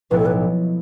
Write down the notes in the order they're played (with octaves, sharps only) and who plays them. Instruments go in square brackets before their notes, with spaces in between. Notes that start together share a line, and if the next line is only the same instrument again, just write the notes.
[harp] B1 A2 F3 B3 E4 [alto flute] B4
[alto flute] A4
B4